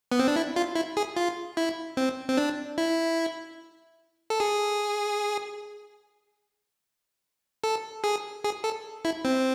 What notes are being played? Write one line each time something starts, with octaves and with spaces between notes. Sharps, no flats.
B3
C4
D4
E4
F4
E4
G#4
F4
E4
C4
C4
D4
E4
A4
G#4
A4
G#4
G#4
A4
E4
C4